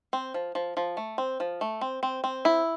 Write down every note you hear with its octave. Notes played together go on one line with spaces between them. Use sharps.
C4
F3
F3
F3
A3
C4
F3
A3
C4
C4
C4
E4